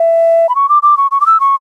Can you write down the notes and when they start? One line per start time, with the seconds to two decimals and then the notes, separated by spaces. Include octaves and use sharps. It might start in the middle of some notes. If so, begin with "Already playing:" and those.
Already playing: E5
0.49 B5
0.55 C#6
0.69 D6
0.83 D6
0.97 C#6
1.11 C#6
1.21 D6
1.26 E6
1.40 C#6